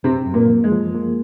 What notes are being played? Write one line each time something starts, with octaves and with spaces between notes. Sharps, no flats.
F#2 C3 C4
F#2
A#2 A#3
F3
G#3
F3
A#3